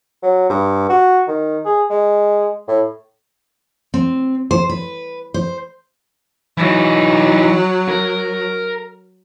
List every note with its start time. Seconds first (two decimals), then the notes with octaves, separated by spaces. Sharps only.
0.23 F#3
0.50 G2
0.89 F#4
1.28 D#3
1.65 G#4
1.90 G#3
2.68 A2
3.94 C4
4.51 C5
4.69 B4
5.34 C5
6.58 E3 F#3 D#4
7.89 A#4